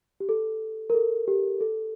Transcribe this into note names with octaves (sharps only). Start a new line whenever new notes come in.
G4
A4
A#4
A4
G4
A4